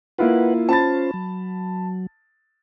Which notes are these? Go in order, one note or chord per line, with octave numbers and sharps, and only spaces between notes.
A#3 E4 F4 B4 F#5
C#4 F4 C5 A5 B5 A6
F#3